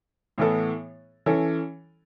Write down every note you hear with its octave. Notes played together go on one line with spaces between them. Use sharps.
A2 E3 B3 A4
E3 C#4 A4